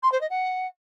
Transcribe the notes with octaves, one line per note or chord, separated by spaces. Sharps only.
C6
C5
D#5
F#5